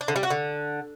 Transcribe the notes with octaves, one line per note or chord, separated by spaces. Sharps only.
D4
D3
G3
F#4
D3